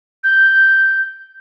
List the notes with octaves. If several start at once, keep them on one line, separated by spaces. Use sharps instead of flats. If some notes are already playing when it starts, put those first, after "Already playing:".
G6